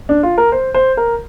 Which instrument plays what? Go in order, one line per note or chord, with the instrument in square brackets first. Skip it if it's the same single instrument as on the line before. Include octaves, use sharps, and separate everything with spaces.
[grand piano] D4
F4
A#4
C5
C5
A#4